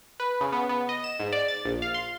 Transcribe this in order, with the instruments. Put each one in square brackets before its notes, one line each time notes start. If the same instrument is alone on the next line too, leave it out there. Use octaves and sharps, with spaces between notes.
[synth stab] B4
C#3
B3
B3
D#5
E7
G#2
D5
A6
A#1
F5
C6